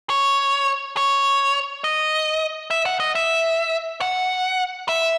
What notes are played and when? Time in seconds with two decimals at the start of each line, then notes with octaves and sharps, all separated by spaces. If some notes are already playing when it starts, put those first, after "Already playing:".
0.10 C#5
0.97 C#5
1.84 D#5
2.71 E5
2.86 F#5
3.00 D#5
3.15 E5
4.01 F#5
4.89 E5